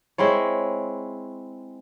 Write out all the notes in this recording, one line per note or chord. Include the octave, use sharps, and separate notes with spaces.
G#3 C4 E4 C#5